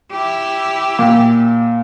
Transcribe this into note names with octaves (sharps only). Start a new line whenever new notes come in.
E4 G4
A#2